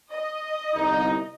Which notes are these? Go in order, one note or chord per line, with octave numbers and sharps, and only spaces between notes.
D#5
G1 C2 D#4